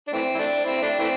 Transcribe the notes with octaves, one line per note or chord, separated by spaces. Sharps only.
D4
E3 A3 C4
E4
A3 D4
C4 E4
A3 D4
E3 A3 C4